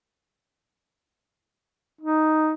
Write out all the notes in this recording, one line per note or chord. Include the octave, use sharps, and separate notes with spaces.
D#4